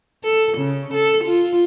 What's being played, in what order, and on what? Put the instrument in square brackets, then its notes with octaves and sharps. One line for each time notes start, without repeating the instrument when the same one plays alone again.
[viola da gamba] A4
C#3
A4
F4